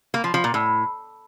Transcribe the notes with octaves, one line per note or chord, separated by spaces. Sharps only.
A#3
F3
F3
A#2
A2